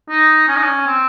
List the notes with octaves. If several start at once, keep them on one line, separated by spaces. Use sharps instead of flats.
D#4
C#4
D#4
C#4
C4